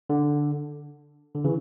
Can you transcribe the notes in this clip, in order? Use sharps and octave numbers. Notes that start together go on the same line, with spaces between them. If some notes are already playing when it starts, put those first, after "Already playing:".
D3
D3
C#3 E3